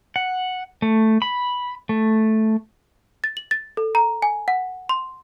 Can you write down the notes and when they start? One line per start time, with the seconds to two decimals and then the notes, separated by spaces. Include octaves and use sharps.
0.16 F#5
0.82 A3
1.22 B5
1.89 A3
3.24 A6
3.37 F#7
3.51 A6
3.77 A4
3.95 A#5
4.22 G#5
4.48 F#5
4.89 C6